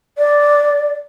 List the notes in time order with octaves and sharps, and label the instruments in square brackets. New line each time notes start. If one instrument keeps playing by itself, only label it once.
[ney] D5